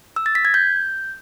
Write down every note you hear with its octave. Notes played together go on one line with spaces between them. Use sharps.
E6
A6
B6
G#6
G6